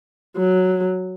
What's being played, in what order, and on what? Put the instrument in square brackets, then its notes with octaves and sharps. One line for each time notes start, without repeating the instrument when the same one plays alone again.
[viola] F#3